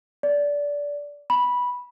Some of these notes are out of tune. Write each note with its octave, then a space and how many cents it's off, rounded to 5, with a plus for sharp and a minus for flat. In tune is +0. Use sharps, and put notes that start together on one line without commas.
D5 -20
B5 -10